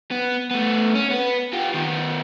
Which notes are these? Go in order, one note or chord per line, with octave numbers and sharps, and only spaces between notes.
B3
A3 B3
C#4
B3 B4
F4 G4
D#3 B3